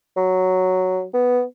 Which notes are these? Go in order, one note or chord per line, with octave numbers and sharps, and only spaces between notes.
F#3
B3